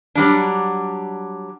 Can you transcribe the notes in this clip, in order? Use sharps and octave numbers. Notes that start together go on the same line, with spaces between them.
F#3 G3 D4